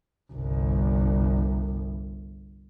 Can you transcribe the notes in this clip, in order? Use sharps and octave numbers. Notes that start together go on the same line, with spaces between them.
G1 C2